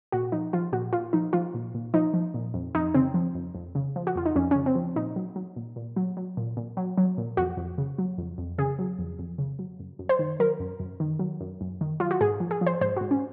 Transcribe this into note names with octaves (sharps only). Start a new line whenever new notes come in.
A#2 F#4
F3 D#4
F3 F4
A#2 F#4
A#2 F4
F3 D#4
F3 F4
A#2
A#2
F3 D#4
F3
A#2
F2
F2 D#4
C#3 C4
F3
F2
F2
C#3
F3
F#4
F2 F4
D#4
F2 C#4
C#3 C#4
C4
F3
A#2 D#4
F#3
F#3
A#2
A#2
F#3
F#3
A#2
A#2
F#3
F#3
A#2
F2 F#4
F2
C#3
F#3
F2
F2
C#3 G#4
F#3
F2
F2
C#3
F#3
F#2
F#2
C5
D#3
F#3 A#4
F#2
F#2
D#3
F#3
F#2
F#2
D#3
F#3 F4
F#4
G#2 G#4
F3
G#4
F3
C5
G#2 C5
G#2 F#4
C#4